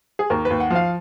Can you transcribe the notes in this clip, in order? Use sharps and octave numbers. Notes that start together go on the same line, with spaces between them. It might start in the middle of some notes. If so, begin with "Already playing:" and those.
G#4
D#2 A#4
B4
D#2
F#5
F3 F5